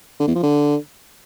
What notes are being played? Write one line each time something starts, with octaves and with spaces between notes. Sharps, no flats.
D3
E2
F3
D3